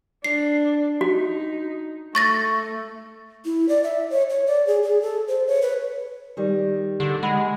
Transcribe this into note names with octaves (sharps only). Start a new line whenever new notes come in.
D4 C7
D#4 F#4
A3 C#6 A6 A#6
E4
D5
E5
C#5
C#5
D5
G#4
G#4
A4
C5
C#5
B4
D#3 G3
D3 G4
G#3 F#5 B5